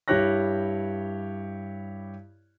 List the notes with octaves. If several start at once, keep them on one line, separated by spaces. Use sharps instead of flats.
G2 E4 G4 C#5 F#6 A#6